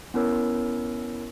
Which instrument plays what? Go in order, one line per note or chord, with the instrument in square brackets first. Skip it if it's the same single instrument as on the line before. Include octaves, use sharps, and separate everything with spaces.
[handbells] B3 C#4 E4 A#4 C#5 E6